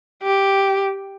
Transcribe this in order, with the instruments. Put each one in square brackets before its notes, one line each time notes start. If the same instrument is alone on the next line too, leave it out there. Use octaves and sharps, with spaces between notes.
[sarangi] G4